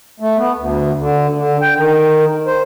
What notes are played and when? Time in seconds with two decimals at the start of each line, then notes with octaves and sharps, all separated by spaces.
0.20 A3
0.37 B3
0.56 D2
0.98 D3
1.35 D3
1.62 G5
1.76 D#3
2.46 C5